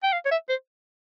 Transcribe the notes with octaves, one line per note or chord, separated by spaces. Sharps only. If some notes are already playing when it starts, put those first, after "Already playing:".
G5
F5
C#5
E5
C5